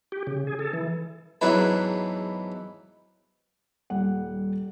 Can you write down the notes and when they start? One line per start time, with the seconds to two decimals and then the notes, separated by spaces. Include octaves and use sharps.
0.12 G4
0.27 C#3
0.47 G#4
0.59 A4
0.73 E3
1.41 E2 G#2 F#3 D4 E4 B4
3.90 D#1 G3 F#5